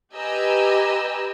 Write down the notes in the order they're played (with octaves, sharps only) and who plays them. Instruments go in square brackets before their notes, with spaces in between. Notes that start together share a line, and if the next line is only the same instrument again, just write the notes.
[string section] G4 B4 D#5 G#5 A#5 E6